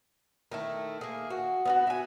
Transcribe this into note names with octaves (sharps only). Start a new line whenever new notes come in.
D#3 A3 E4
A#3 G#4
F#4
B3 C#4 F#4
E5 G#5